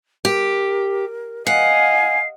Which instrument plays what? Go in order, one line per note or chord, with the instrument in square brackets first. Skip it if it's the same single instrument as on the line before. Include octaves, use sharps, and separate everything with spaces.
[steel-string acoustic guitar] G4 [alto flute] A#4
[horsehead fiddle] D#5 F5 [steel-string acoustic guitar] F#5 [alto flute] G#5 [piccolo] C7